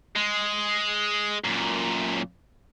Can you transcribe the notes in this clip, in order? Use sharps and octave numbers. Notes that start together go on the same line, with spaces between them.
G#3
F#2 A#2